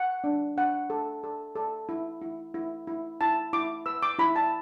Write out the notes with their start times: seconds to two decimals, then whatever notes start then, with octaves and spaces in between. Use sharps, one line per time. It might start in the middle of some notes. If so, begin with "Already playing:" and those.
Already playing: F#5
0.24 D4
0.57 D4 F#5
0.90 A4
1.23 A4
1.56 A4
1.89 E4
2.21 E4
2.54 E4
2.87 E4
3.21 E4 A5
3.53 E4 D6
3.86 B4 E6
4.02 D6
4.19 E4 B5
4.36 A5